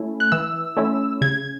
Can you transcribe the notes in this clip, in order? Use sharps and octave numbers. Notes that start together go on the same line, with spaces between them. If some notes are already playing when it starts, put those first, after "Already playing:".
Already playing: A3 C#4 E4
F#6
E3 E6
A3 C#4 E4
C#3 G#6